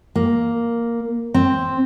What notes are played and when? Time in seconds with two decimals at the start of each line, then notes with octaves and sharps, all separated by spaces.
0.16 A#3
1.34 C4